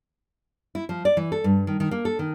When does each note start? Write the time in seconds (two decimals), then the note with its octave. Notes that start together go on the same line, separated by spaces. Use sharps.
0.75 E4
0.89 F3
1.05 D5
1.17 E3
1.32 A4
1.44 G2
1.67 D#3
1.80 D#3
1.91 A#3
2.05 A4
2.19 D#3